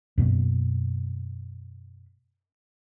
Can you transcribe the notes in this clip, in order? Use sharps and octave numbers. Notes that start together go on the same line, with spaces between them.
F#2 B2 A#3